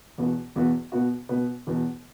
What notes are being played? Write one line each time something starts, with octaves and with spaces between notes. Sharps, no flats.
E2 B2 B3 F#4
E2 B2 B3 F#4
B2 B3 F#4
B2 B3 F#4
E2 B2 B3